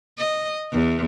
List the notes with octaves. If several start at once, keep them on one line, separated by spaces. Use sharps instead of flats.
D#5
E2